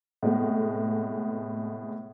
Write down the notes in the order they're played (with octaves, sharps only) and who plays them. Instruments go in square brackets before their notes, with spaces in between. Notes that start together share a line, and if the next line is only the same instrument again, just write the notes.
[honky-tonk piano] A2 C3 G#3 A3 B3